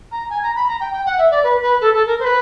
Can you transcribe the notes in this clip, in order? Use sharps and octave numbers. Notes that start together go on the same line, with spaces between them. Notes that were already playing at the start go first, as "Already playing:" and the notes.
A#5
G#5
A#5
B5
A#5
G5
G5
F#5
E5
D5
B4
B4
A4
A4
A#4
C5
B4